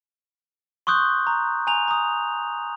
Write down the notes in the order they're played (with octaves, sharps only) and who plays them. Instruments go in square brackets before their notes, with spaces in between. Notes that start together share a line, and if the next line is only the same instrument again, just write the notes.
[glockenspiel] C6 C#6 D#6 F#6 G6
A#5
G#5 A#5 F7
A#5 D#6